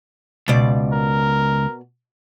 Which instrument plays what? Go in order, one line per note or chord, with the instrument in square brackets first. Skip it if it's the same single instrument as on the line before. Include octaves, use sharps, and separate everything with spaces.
[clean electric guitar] C#2 [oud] B2 D5
[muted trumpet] A#4